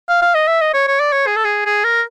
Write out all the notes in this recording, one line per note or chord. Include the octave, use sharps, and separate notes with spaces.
F5
F5
D#5
E5
D#5
C#5
C#5
D5
C#5
G#4
A4
G#4
G#4
A#4